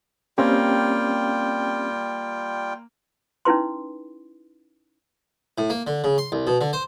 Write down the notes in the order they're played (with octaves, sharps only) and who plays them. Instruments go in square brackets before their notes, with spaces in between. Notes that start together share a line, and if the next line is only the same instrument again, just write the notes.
[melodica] G3 F4 G5 [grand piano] A#3 [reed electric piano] C4 C#4 G4
[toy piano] C#4 D#4 E4 B4 C6
[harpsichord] A2
A#3
D3
C#3
C6
C2
B2
D3
C5